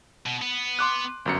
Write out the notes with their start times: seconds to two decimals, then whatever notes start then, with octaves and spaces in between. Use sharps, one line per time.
0.26 B2
0.42 B3
0.79 C6 D6 F#6
1.25 G1 F#2 C#7